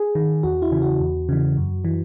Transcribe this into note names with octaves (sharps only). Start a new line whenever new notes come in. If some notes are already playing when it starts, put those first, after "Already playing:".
Already playing: G#4
D#3
E2 F#4
E4
C#3 E3
F#4
E2
C#3 E3
F#2
E3